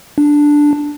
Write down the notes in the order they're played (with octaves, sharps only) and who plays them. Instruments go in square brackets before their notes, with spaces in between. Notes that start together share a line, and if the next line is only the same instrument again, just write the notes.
[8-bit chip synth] D4